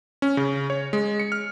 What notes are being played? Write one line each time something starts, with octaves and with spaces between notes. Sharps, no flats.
C#4
C#3
C#5
G#3
C#7
F6